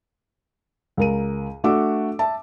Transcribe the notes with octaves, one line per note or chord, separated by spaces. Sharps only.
C#2 A#4 D#7
A3 D4 F#4 D6 E6
E5 A5